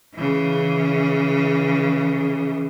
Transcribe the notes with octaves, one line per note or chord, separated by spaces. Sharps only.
C#3 E3